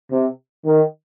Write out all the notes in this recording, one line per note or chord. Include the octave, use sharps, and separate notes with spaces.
C3
D#3